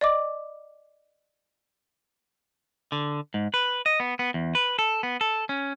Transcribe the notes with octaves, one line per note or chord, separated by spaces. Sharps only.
D5 D#5 D6
D3
G#2
B4
D#5
B3
B3
E2
B4
A4
B3
A4
C#4